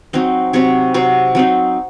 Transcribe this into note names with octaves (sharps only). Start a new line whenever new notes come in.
F#3 C4 D#4
C3 F#3 C4 C#5
C3 F#3 C4
F#3 C4 D#4